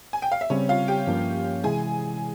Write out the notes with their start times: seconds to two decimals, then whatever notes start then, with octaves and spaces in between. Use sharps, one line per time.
0.13 G#5
0.22 G5
0.32 F5
0.41 E5
0.50 C#3 G3 C4 C#4 C#5
0.69 F4 F5
0.88 G4 G5
1.07 G2 F3 A#3 C#4
1.64 C3 E3 G#3 E4 G#4 G#5